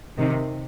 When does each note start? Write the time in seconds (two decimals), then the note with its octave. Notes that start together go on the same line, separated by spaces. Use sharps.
0.18 C3 D#3